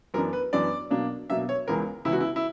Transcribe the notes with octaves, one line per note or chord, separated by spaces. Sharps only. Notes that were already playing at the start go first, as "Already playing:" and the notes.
F#2 E3 B3 D4 A#4
B4
F#2 E3 B3 D4 D5
B2 F#3 A#3 D4
B2 F#3 A#3 D4 E5
C#5
C#2 C#3 E3 B3 A#4
C#2 C#3 E3 B3 E4
F#4
E4
E4